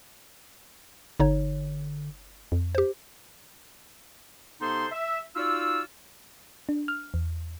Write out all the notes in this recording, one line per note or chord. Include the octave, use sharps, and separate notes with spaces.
G1 D3 D#4 C#5
F2
G4 C5
C3 B3 D#4 A4 C5 C6
E5
D#4 F4 F#4 D5 F5 E6
D4
F6
E2